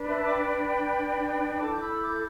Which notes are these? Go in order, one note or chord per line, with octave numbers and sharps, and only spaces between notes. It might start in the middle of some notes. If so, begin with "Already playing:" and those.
Already playing: D4 B4
E5 A5
D6
G5 B5
E4 A4 A5 D6
G6
B5 E6
D6 G6